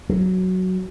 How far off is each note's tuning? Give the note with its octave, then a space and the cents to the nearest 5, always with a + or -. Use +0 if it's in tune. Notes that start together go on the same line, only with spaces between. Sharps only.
F#3 +5